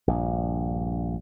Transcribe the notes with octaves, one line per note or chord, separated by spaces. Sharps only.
A#1 G2